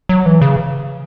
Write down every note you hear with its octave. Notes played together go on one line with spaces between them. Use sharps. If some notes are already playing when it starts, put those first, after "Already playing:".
F#3
E3
C#3